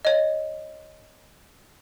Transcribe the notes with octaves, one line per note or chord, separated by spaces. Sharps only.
C#5 D#5